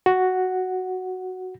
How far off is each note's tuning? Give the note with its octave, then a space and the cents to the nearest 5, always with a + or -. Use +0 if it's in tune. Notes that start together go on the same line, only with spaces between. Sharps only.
F#4 +0 F#5 +0